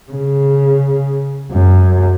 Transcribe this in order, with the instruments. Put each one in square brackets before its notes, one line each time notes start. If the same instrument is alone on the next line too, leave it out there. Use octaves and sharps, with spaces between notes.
[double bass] C#3
F#2